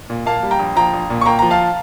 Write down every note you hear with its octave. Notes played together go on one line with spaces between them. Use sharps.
A#2
A#3 F5 A5
G3
G5 A#5
A#1
F3 G5 A#5
A#1
A#2
C#6
A#3 G5 A#5
F3 A#5
F5 A5